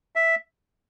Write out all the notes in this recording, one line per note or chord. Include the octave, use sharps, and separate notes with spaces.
E5